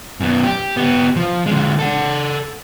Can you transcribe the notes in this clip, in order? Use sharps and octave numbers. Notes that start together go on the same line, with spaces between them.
F#2 B3
G4
B3 G4
F3
D3 G#3
A4 F#5